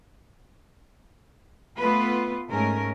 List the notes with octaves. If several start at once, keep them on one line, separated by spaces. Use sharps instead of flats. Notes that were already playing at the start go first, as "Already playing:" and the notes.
A3 B3 F4 B4
G#2 A3 C#4 A#4